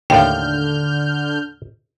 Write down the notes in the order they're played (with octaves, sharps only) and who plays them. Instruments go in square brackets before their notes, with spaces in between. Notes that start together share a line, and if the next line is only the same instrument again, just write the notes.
[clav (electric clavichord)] D#2 A2 [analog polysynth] D3 F6 G6 [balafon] F5 G5